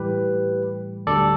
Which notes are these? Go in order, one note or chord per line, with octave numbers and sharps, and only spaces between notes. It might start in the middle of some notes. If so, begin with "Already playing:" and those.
Already playing: A2 E3 G3 G4 B4
D2 D3 G3 A4 D5